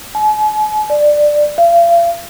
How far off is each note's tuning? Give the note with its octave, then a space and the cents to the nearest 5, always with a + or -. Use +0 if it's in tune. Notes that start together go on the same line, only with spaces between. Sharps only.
G#5 +45
D5 +10
F5 -40